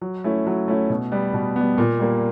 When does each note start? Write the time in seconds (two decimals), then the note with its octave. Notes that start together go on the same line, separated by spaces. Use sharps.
0.01 F#3
0.24 A3 C#4 E4
0.47 F#3
0.68 A3 C#4 E4
0.90 B2
1.11 G3 B3
1.34 B2
1.56 G3 B3
1.78 A#2
1.99 G3 A#3